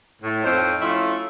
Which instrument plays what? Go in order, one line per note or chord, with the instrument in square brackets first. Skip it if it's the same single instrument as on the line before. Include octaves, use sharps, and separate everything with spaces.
[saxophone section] A2
F2 C4 D#4 C5 C#5
F3 A3 C#4 E4 F4